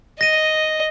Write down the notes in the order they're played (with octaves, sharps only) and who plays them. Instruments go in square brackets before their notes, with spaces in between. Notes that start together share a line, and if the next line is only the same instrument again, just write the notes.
[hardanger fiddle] D#5 [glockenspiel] A#6 D#7